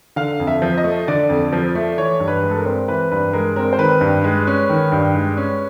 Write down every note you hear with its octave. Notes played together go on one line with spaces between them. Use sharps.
D3 F5
F2
E5
F3
D#5
A3
D3 D5
F2
F3
A3
E3 C#5
G2
B4
G#3
A4
A#4
C4
E3 B4
G2 B4
G#3 A#4
C4 A#4
C5
D#3 B4
G2
G#3
C#4
D#3
G2
G#3
C#4